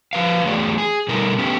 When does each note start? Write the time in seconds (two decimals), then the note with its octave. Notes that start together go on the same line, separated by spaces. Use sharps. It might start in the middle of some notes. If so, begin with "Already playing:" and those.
0.13 F3 B4 F5
0.44 E2 F#3 A3 G#4 D5
0.78 G#4
1.08 B2 G3 A3 D#4 A#4
1.38 A3 B3 C#4 G4